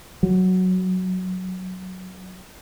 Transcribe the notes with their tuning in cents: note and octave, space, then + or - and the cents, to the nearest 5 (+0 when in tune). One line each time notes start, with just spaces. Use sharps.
F#3 +0